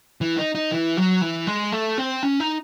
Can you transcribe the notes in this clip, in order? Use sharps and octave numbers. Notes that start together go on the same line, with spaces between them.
E3
D#4
D#4
E3
F#3
E3
G#3
A3
C4
C#4
D#4